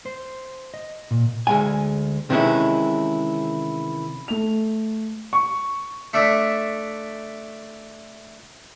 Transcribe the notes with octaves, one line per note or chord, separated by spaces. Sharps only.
C5
D#5
A#2
D2 G#3 G#5
C3 D#3 E3 G#3 C#4 E4
A3 F7
C#6
A3 D4 E5